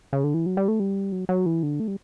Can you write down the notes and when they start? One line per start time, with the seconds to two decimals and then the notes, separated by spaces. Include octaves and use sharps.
0.13 C#3
0.24 D3
0.34 E3
0.46 F#3
0.57 G3
0.68 A3
0.80 G3
1.12 F#3
1.29 F#3
1.46 E3
1.63 D3
1.80 A3
1.88 G3